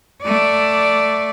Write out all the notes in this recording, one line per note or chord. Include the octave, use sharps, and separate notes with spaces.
A3 D5